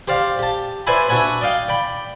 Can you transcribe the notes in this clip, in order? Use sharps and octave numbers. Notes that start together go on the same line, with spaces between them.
G4 C5 D5 F5
G4 A5
B4 C5 D5 E5 G#5 B5
D4 F#4 E5 F#5 G#5 B5
D5 D#5 F5 G5
D5 G5 B5